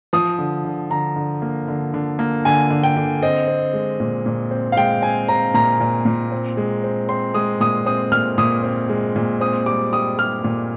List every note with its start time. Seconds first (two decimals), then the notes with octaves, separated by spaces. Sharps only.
0.13 F3 D#6
0.38 D3
0.65 D3
0.90 D3 A#5
1.16 D3
1.42 A#3
1.68 D3
1.94 D3
2.19 A#3
2.45 D3 G#5
2.70 D3
2.83 G5
2.97 D3
3.23 C4 D#5
3.48 C4
3.73 G#3
4.00 A#2
4.26 A#2
4.51 C4
4.72 F5
4.77 G#3 G5
5.02 C4 G#5
5.28 C4 A#5
5.54 A#2 A#5
5.80 A#2
6.05 A#2
6.32 C4
6.57 G#3
6.84 C4
7.09 C4 C6
7.34 G#3 D#6
7.60 A#2 D#6
7.86 C4 D#6
8.12 A#2 F6
8.38 A#2 D#6
8.64 C4
8.89 G#3
9.16 A#2
9.41 C4 D#6
9.66 G3 D6
9.93 G3 D#6
10.18 G3 F6
10.44 A#2